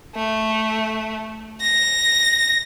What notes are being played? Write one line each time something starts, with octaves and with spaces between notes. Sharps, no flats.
A3
A#6